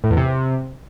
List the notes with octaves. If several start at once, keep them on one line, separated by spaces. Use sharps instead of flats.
A2
E2
C3